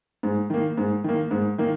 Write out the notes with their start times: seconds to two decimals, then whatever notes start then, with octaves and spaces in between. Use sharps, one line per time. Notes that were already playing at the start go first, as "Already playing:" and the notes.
0.23 G#2
0.50 D#3 A#3
0.77 G#2
1.04 D#3 A#3
1.31 G#2
1.58 D#3 A#3